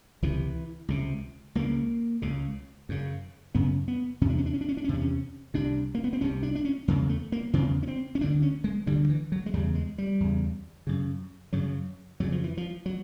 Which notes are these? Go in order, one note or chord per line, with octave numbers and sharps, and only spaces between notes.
C#2 C3 E3
C#2 C3
C#2 C#3 A#3
C#2 C#3
F#2 C#3
F#2 C#3 B3
B3
E2 C3 C#4
D4
C#4
D4
C#4
D4
C#4
D4
C#4
E2 C3 D4
C#4
C2 C3 D4
A#3
B3
C4
C2 C3 C#4
D4
D4
C#4
E2 C#3 A#3
A3
A#3
E2 C#3 C4
C#4
C4
C#4
D2 D3 D4
C#4
G#3
D2 D3 G3
E3
F#3
G#3
E2 C#3 G3
G#3
G3
E2 C#3
F#2 C#3
F#2 C#3 F#3
F2 C#3 F#3
F3
E3
F3
F#3